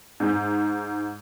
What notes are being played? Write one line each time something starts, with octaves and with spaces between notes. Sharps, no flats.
G#2